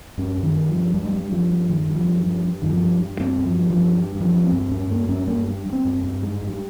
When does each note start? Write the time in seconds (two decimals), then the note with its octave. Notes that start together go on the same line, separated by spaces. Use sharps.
0.18 G2 C#4
0.38 G2
0.43 D#3
0.56 G2
0.69 F3
0.75 G2
0.94 G2 G3
1.05 G#3
1.13 G2 G3
1.31 G2 F3
1.51 G2
1.69 G2 D#3
1.89 G2
1.95 F3
2.07 G2
2.20 F3
2.26 G2
2.45 G2
2.62 G2 D#3
2.70 F3
2.83 G2
3.01 G2
3.20 G2 C4
3.39 G2
3.45 F3
3.58 G2
3.70 F3
3.77 G2
3.95 G2
4.15 G2
4.21 F3
4.34 G2
4.46 C4
4.52 G2
4.71 G2 C#4
4.90 G2 A#3
5.09 G2 C#4
5.27 G2 A#3
5.47 G2
5.66 G2
5.73 C4
5.85 G2
5.98 C4
6.04 G2
6.22 G#2 G#3
6.41 G#2
6.47 G3